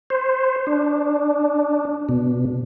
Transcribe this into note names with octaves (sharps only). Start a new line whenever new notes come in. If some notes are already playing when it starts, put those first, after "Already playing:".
C5
D4
B2